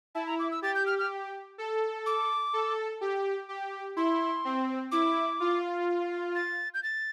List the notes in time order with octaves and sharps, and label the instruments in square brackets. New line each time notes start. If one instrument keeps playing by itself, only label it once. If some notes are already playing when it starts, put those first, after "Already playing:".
[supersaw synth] E4 [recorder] A5
[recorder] A#5
D6
E6
[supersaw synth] G4 [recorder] A6
[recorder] G6
F6
F6
[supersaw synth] A4
[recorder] D6
[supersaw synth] A4
G4
G4
[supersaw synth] E4 [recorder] C6
[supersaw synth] C4
[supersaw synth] E4 [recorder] D6
[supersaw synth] F4
[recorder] A6
G6
A6